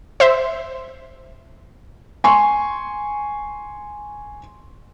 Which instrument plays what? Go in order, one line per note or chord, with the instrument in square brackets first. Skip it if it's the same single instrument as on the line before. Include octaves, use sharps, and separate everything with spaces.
[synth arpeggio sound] C5 E5
[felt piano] G#5 C6 C#6